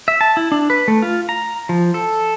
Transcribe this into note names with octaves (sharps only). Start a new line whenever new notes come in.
E5
A5
E4
D4
B4
A3
F4
A#5
F3
A4